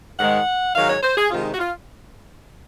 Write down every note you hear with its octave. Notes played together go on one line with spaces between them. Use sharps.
G#2 D#3 G#3 F#5
G#2 D#3 F#3 F5
C#5
C5
G#4
C3 D#3 G#3 F4
D#4
F#4
F4